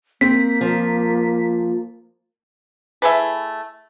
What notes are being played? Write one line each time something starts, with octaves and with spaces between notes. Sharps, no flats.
A#3 C4 B6
F3
A3 E4 G#4 B4